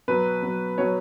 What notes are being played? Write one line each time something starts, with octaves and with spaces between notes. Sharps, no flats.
B2 F#3 B4
B2 F#3
B2 F#3 C#5